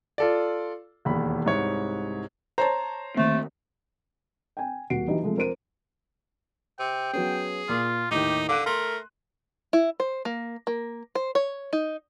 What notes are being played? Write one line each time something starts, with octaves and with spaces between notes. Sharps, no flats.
F4 A4 D5
E1 D#2 B5
C2 G#2 C#5
C5 C#5 A5 A#5
D2 D#3 A3 A#3 C4
G5 G#5
D#1 F#4 F#5 C7 D7
E3 F#3 D#4 G4 D#5
C3 F3 G#3 A3
F2 A#4 C5 D7 D#7
C3 G5
F#3 B3 C#4 G#4
A#2 F4
D#2 A2 D#4 G4
D3 F5 D6 F#6 D#7
A3 A#4 C6
E4
C5
A#3
A#3
C5
C#5
D#4